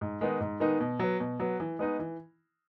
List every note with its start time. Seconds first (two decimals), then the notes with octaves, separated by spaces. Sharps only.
0.01 G#2
0.21 D#3 G#3 B3 D#4
0.40 G#2
0.60 D#3 G#3 B3 D#4
0.80 B2
0.99 F#3 B3
1.20 B2
1.40 F#3 B3
1.60 E3
1.79 G#3 B3 D#4
1.99 E3